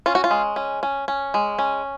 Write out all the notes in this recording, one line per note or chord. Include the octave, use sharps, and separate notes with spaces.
C#4 F4
F#4
F4
G#3
C#4
C#4
C#4
G#3
C#4